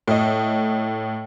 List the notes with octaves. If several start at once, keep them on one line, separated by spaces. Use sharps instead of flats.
A2 D#5